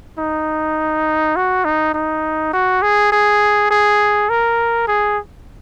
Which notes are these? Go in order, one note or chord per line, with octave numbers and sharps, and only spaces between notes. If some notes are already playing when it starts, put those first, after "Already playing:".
D#4
F#4
D#4
D#4
F#4
G#4
G#4
G#4
A#4
G#4